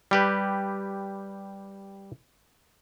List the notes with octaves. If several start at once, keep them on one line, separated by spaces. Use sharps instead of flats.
G3 G4 B4